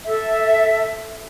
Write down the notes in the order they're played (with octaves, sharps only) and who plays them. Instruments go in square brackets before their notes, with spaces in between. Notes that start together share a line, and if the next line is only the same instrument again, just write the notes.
[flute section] A4 E5